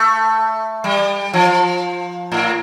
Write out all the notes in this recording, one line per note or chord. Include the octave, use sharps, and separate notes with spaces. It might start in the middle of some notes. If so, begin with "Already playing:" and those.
Already playing: A3
G3
F3
A2